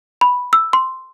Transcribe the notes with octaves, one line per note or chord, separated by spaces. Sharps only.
B5
E6
C6